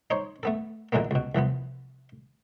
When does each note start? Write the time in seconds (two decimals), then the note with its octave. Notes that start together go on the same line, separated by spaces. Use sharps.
0.10 D#4 C5 C#5
0.43 A3 B3 A4
0.92 A#1 D3 E3 G#3 A#3 B3
1.11 C#2 B2
1.35 C2 E3 F3 B3